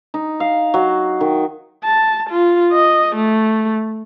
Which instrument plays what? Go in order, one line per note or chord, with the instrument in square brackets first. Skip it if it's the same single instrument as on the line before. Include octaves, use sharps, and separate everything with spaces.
[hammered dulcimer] D#4
F5
F#3
D#3
[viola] A5
F4
D#5
A3